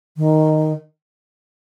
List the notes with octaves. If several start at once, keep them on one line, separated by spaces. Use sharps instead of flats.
D#3